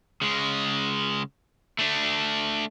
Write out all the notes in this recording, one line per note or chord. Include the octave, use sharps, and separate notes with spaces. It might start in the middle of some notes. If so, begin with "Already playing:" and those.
C#3 G#3
A3 D4